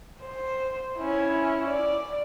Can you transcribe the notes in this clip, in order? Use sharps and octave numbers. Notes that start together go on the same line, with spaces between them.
C5
C#4 E4
D5